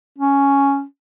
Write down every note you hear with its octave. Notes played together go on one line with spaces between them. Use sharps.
C#4